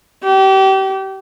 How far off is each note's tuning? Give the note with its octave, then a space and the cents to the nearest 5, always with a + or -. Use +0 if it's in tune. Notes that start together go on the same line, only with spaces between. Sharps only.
G4 -30